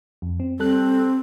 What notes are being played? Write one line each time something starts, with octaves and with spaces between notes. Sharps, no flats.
F2
C4
G3 C4 A4 F#6